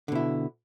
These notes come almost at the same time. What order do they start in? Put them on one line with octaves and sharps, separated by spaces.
D3 B2 E4